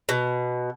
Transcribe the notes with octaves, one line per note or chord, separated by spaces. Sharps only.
B2